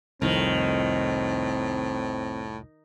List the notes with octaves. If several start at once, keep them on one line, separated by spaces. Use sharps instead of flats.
C2 F2 A2 D#3 C4